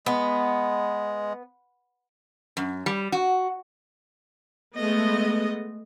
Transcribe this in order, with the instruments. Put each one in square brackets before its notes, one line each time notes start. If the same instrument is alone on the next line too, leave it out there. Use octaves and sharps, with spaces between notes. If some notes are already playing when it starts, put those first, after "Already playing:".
[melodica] G#3 [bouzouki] B3
[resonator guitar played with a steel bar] F#2
G3
F#4
[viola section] G#3 A3 B3 D#5